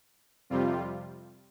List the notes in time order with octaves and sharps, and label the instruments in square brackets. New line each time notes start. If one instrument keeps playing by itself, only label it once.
[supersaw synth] F2 C3 G3 F4